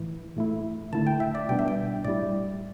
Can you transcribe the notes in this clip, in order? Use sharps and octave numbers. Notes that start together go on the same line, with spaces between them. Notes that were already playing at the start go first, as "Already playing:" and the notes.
Already playing: A2 E3 E4
A2 A3 E4
D3 A3 E4 A5
G5
E5
D5
B2 G3 B3 D4 G5
E5
G5
A2 G3 E4 D5